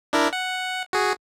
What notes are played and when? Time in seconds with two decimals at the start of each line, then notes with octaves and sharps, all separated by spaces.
0.13 D4 E4 A#4
0.33 F#5
0.93 F#4 G#4